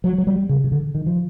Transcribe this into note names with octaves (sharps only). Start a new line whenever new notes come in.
F#3
F#3
G3
C#3
C#3
D3
D#3
F3